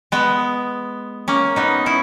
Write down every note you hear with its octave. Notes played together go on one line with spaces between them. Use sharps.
G#3 B3
A#3 C#4
B3 D#4
C#4 E4